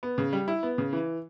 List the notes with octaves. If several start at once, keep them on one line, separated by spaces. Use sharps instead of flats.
B3
C#3
G3
E4
B3
C#3
E3